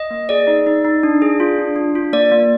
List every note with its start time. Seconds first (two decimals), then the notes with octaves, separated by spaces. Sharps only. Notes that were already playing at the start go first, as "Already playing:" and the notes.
Already playing: D#5
0.11 A#3
0.29 G#4 D5
0.47 D#4
0.67 D#4
0.85 D#4
1.03 D4
1.22 G#4
1.40 F4
1.59 D4
1.76 D4
1.95 F4
2.13 A#3 D5
2.32 A#3